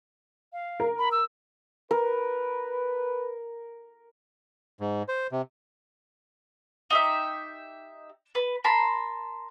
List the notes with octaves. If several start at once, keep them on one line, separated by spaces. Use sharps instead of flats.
F5
A#4
B5
E6
A#4 B4
G#2
C5
C3
D#4 G4 E5
B4
A#4 A5 B5 C6